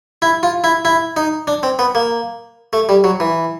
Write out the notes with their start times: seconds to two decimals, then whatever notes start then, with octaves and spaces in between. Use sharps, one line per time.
0.22 E4
0.43 F4
0.64 E4
0.85 E4
1.17 D#4
1.47 D4
1.63 C4
1.79 B3
1.95 A#3
2.73 A3
2.89 G3
3.04 F#3
3.20 E3